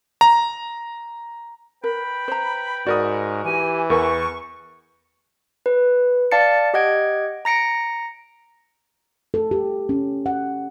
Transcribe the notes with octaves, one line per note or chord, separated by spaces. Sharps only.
A#5
A#4 B4 G5 B5
C5 A#5
G#2 F#4 A#4 D5 D#6
E3 G4 G#5
E2 A#4 B4 E5 C#6
B4
D5 F5 A5 A6 C#7
G4 D#5 F#5 G#6 D7
A#5 A#6 C#7 D7
A4
G4
C#4
F#5